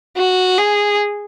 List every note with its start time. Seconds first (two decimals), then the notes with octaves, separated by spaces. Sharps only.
0.17 F#4
0.58 G#4